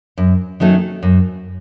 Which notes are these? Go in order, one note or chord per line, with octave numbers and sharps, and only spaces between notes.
F#2
D#3 F#3 A3 C#4
F#2